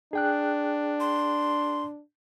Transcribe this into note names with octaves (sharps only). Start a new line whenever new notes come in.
D4 G#4 G5 F#6
C6